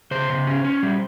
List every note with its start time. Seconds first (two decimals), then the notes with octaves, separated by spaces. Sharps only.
0.11 C#3 C5
0.30 C#3
0.47 C#4
0.65 C#4
0.83 G3